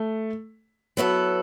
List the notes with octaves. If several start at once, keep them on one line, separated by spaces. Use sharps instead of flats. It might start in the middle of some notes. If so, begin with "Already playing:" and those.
Already playing: A3
F#3 B3 E4 A4